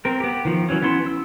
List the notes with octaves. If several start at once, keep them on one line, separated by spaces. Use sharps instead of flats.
C4 A#4
B3 G4
D#3 F3
E3 F#3 C#4
B3 C#4 E4 C6
E6